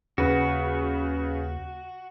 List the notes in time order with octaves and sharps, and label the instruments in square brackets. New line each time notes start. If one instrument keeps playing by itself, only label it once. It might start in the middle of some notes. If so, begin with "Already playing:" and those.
[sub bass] D#2 [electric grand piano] C#3 B4 [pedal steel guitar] F#4